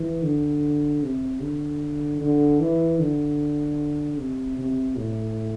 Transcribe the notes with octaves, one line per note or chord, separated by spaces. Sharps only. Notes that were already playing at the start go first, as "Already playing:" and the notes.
Already playing: E3
D3
C3
D3
D3
E3
D3
C3
C3
A2